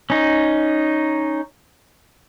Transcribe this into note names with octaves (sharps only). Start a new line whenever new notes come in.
C#4 D#4